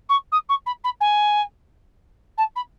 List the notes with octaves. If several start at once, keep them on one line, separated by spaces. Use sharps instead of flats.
C#6
D#6
C#6
B5
B5
G#5
A5
B5